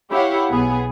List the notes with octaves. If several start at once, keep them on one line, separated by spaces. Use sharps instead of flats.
E4 G4 C#5 F5 F#5
B1 B3 G#4